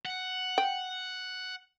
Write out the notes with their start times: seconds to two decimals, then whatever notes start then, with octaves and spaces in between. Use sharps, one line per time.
0.05 F#5
0.58 G5